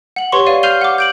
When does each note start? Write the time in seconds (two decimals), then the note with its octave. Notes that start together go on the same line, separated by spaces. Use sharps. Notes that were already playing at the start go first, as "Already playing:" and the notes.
0.16 F#5 F#7
0.32 G4 B4 C#5 F#5 C6 C#6
0.46 D5 F5 D#7
0.63 F6 G6 C7 D#7 F7 G7
0.81 F#5 D6
0.98 G6 D7 F#7